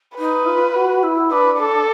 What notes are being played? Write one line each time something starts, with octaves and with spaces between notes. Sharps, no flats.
D#4 B4
F4
F#4
E4
D4 B4
A4